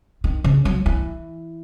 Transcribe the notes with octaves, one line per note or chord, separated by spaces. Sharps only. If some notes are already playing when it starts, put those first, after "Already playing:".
D#3
C#3
F#3
E3